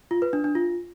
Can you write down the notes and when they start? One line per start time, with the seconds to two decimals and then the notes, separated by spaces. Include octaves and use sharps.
0.11 F4
0.22 B4
0.33 D4
0.44 D4
0.55 F4